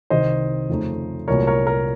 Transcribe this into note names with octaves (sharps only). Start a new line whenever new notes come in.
C2 C3 D#3 C5 D#5
F2 C#3 A3 D#4
C2 A#2 F#3 A3 A#4 C#5
A#4 C#5
A#4